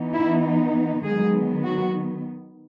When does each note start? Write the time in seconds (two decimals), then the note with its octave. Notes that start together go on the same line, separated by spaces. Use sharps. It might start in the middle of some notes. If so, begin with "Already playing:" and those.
Already playing: E3 B3 D#4
0.15 E4
1.03 D#3 F#3 G#3 B3 G#4
1.65 F#3 F#4